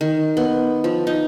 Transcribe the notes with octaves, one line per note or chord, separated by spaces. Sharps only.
D#3
B3
F3
D#4